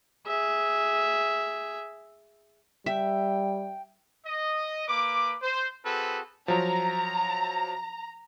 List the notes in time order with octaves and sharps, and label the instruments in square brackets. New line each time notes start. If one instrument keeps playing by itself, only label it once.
[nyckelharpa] G#4 E5
[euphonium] G3 [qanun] E5 [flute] G5
[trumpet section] D#5
A#3 B4 D6
C5
C4 F#4 G#4 A4 B4
[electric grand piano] F3 F#3 [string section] A#5